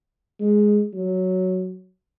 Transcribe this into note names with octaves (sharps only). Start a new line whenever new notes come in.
G#3
F#3